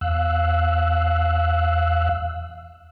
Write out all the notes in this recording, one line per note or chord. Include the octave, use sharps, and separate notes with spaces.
E2 F5 E6 F#6